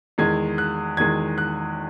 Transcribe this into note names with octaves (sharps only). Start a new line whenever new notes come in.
E2 D#3 G#3 G#6
F#6
E2 D#3 G#3 G#6
F#6